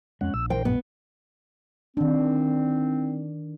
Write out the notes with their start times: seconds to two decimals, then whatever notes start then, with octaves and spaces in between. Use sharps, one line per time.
0.21 F2 G#3 C#4 F#5
0.34 A#1 E6
0.50 E3 A#4 C5 G5
0.65 G2 A#2 B3
1.97 D#3 C4 D4